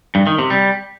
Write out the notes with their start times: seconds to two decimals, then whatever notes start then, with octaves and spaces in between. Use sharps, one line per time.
0.15 G2
0.27 D#3
0.39 C3
0.50 G3